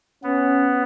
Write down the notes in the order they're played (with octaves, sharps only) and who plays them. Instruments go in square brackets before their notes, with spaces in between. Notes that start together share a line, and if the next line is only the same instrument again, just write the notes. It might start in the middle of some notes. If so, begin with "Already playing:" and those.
[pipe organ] B3 [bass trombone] C#4